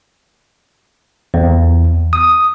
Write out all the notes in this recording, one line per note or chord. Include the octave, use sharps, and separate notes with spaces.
E2
D#6